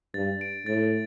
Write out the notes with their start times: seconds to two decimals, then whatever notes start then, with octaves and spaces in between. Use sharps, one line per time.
0.14 G2 A6
0.41 D7
0.66 A2 A6